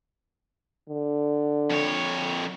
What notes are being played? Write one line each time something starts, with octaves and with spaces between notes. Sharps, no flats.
D3
F2 C#5